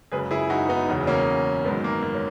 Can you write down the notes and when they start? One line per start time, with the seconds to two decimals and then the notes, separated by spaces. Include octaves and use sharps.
0.12 F#1 F#2 C#3 G#3 G#4 B4
0.31 E4 G#4
0.50 D#4 F#4
0.69 B3 D#4
0.89 E1 E2 C#3 F#3
1.07 A#3 C#4
1.65 G#1 F#2 D#3 G#3 B3
1.84 A#3
2.03 A#3
2.15 C#4